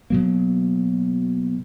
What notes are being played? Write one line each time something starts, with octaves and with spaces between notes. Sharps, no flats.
B2 F#3 A#3